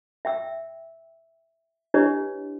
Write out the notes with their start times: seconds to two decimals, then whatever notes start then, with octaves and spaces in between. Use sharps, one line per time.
0.25 E5 G5 E6
1.94 D4 E4 G4 B4 C#5 D#5